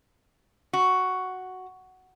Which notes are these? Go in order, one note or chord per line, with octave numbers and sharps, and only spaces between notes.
F#4